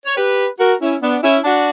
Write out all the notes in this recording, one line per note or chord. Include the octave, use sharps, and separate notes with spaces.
C#5
G4 B4
F#4 A#4
C#4 E4
B3 D4
C#4 E4
D4 F#4